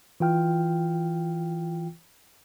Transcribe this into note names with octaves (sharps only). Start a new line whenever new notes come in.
E3 F4 G5 F6